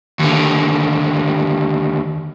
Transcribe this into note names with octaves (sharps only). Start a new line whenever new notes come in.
D#2 D3